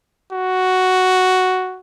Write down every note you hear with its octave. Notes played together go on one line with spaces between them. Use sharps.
F#4